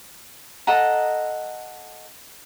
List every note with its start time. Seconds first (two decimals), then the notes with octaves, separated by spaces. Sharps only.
0.67 A4 D#5 F#5 A#5